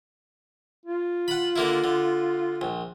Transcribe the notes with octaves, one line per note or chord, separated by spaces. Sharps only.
F4
F#5 B5
D3 A#3 E4
D3
A#1